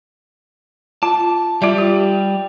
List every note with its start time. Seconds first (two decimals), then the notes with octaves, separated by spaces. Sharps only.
1.03 F4 A5
1.62 G3 F4 E5
1.78 G4